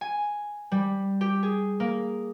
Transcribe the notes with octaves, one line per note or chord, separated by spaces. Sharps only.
G#5
G3
G4
G#4
A#3